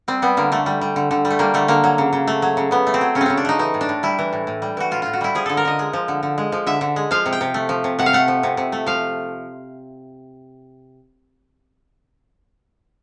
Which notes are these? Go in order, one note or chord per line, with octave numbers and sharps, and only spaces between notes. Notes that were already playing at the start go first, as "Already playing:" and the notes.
G3 C4
G3 B3
D3 A#3
D3 A3
G3
G3
D3
D3
G3
A3
G3 A#3
D3 A3
D3 A#3
F#3
C#3
C#3
A3
F#3
C#3
C#3 B3
A3
C4
F#3
C#3 C#4
C4
C#3 C#4
D4
A3 D#4
E3 D#4
A2
D4
A2
G3 E4
E3
A2
A2
G3
E3 F#4
A2 F4
A2 F4
F#4
G3 E4
F3 G#4
D3 A4
A#4
D3 D#5
G#3
F3
D3
D3
G#3
F3
D3 E5
D3
G#3
F3 F5
C3
G5
C3
A3
F3
C3
C3 F#5
F5
A3 F#5
F3
C3
C3
A3
F3 F5